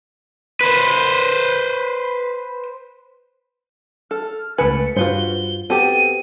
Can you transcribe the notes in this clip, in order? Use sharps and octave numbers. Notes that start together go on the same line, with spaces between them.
B4 C5
A4 F6
C#2 A3 A4 B4 G#5 C#7
G2 F4 F#4 B4 C5 G7
B3 C4 F#4 G4 A4 D#7